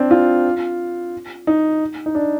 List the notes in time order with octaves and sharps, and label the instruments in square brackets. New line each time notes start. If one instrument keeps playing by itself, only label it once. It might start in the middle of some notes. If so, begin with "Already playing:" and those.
Already playing: [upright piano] C4 D4
F4
D#4
D#4
D4